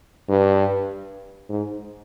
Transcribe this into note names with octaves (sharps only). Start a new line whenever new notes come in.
G2
G#2